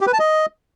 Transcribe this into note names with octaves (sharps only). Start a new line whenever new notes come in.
G4
B4
A5
D#5